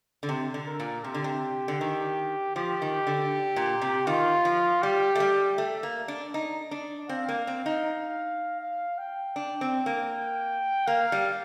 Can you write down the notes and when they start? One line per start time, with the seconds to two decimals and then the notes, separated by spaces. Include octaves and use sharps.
0.23 D3
0.29 C3
0.54 D3
0.67 A#4
0.80 A#2
1.04 C3 G4
1.14 D3
1.24 C3
1.68 D3
1.81 D#3
2.56 F3 G4
2.82 D#3
3.07 D3
3.56 A#2
3.82 C3
4.07 D#3 F4
4.45 F3
4.83 G3 G4
5.15 A3
5.20 G3
5.58 A3
5.83 A#3
6.08 D4
6.34 D#4
6.71 D4
7.09 C4 F5
7.28 A#3
7.47 C4
7.66 D#4
8.61 F5
8.98 G5
9.36 D4
9.61 C4
9.86 A#3
10.87 A#3 F5
11.12 G3